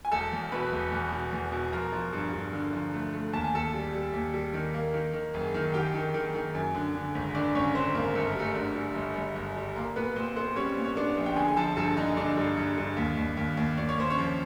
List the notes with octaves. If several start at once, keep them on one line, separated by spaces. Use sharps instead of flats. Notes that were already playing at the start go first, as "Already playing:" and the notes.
G#5
E1 A4 A5
E2
B2 B4 B5
E1
E2
B2
E2
B2
F3 A#4 A#5
F3
G2
G2
D3
F3
A3
A3
D#2 A5
G#5
D#2 A4 A5
G3
G3
D#2
G3
D#3
A#3
D#3
D#3
F#1
D#3
D#3 G4 G5
D#3
D#3
D#3
F#2
D3
D3
G#1
D3 D4 D5
G#1 C#4 C#5
D3 C4 C5
G#1 A#3 A#4
G1 A4
A#4
G3 A3 A4
D3
G3
G1
G1
G1
G3
A#2 A#3 A#4
A#2 B3 B4
A#2 C4 C5
B3 C4 C5
G3 C#4 C#5
A#2
C#5
B3 D4 D5
A#1
G5
D3 G#4 G#5
G#5
F3 A4 A5
G2 A4 A5
D3 D#4 D#5
G2 D4 D5
G2
G2
G2
D#2
D#2
D#2
D#2
D#2 D5
C#5
D#2 C5
C#4 C#5
F3